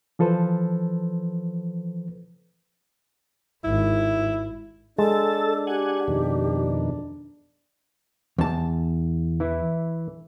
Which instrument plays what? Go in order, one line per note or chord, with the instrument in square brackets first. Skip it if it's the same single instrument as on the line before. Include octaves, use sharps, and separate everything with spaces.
[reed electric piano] E3 F3 A4 B4 C5
[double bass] G#1 [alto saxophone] E4
[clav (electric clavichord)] G#3 [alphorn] D4 [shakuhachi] A4 [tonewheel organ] A5
[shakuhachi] G4 [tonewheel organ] F#5 G#5
[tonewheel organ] F2 B2 D#3
[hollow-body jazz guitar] E2 A5
[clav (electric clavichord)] E3 E4